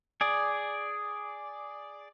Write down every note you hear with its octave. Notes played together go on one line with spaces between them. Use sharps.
G#4 D5